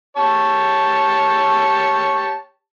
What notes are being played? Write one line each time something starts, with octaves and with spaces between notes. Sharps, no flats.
G4 C#5 A5